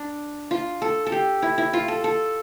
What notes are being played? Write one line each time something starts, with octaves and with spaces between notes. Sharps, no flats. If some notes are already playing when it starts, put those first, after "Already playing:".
Already playing: D4
F4
A4
A4
G4
E4
E4
F4
A4
A4